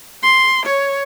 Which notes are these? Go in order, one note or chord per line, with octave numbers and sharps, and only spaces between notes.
C6
C#5